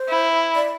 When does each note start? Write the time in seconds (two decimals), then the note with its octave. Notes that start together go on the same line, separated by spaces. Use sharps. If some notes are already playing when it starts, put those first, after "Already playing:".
Already playing: C5
0.08 E4
0.55 D5